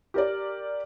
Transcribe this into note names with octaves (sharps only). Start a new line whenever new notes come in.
G4 A#4 D5